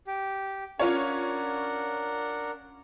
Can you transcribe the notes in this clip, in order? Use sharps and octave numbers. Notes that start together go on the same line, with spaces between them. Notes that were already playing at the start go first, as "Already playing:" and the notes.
G4
C#4 D4 F4 A#4 C#5 F#5